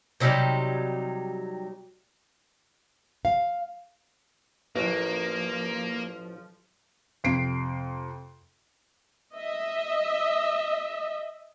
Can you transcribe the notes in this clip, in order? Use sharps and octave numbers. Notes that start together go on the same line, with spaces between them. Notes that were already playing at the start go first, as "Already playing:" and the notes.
C3 F#3 G3 D#4
F5
A1 F3 A#3
F2 C3 C7 D7
D#5 E5